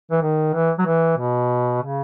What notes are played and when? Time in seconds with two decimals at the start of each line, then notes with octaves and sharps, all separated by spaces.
0.11 E3
0.22 D#3
0.54 E3
0.79 F#3
0.86 E3
1.18 B2
1.82 C#3